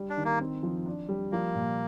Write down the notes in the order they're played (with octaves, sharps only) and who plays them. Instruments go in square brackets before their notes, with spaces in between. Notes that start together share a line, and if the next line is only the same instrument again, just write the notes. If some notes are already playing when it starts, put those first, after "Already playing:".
Already playing: [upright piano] G3
[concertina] D4
[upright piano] D#3
[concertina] A#3
[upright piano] C4
F3
D4
G3
[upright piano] F3 [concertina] A#3
[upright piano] A#2